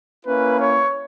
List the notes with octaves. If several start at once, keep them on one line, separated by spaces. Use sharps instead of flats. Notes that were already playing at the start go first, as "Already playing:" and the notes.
A#3 C#4 E4 B4
C#5